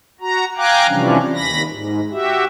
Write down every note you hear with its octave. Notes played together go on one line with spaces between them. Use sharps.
F#4 A#5
F5 G5 G#5 A#5 D6 F#6
C3 E3 F3 G3 C#4 D4
D#2 B5 A#6
G#2
F#4 G4 E5